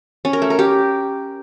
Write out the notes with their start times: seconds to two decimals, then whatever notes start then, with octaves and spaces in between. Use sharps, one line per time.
0.25 C#4
0.33 A#4
0.42 A3
0.50 A#4
0.59 G4